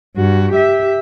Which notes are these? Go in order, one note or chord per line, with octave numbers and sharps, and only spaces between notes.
G2 F#4
G4 E5